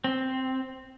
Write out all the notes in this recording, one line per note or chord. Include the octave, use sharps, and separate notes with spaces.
C4